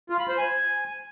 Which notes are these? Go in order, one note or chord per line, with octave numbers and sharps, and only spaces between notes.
F4
B5
C5
G#5